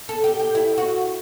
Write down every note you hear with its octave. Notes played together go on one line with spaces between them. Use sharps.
A4
G4
G4
E4
F#4